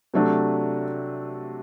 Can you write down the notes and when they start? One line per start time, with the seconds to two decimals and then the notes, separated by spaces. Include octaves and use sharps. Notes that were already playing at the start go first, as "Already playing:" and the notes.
0.14 C3 F#3 A3 D4